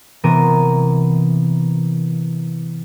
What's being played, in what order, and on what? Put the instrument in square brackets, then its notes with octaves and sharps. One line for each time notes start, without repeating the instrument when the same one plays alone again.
[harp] C3 E3 B3 C4 A#4 D#7